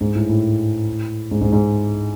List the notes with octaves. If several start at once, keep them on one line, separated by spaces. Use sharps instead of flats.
G#2
A2
A2
G#2
G#2
G#2